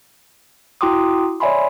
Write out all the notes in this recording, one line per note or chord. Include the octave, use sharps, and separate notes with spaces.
E4 F#4 G5 C6 D6 D#6
C#5 D5 E5 G#5 B5 C6